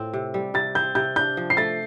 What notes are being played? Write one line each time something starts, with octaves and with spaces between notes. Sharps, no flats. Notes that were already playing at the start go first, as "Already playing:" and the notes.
Already playing: A2 C4 F4
C3
G3
C3 A6
C4 G6
C3 G6
D4 G6
F3
C7
A3 A6